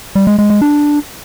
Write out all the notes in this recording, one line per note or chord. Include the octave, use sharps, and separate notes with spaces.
G3
G#3
G#3
G#3
D4